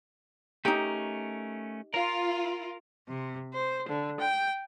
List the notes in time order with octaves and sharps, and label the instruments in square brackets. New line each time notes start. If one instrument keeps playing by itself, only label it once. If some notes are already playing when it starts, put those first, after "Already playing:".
[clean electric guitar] A3 C#4 A#4 [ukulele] D#4 G4
[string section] F4 [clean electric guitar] A#4
[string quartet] C3
C5
D3
G5